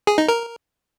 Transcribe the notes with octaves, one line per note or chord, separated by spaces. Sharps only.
G#4
D#4
A#4